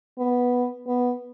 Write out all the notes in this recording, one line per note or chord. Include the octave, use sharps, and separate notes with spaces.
B3
B3